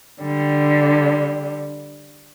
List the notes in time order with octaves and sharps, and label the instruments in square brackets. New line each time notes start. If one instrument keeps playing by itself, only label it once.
[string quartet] D3 G3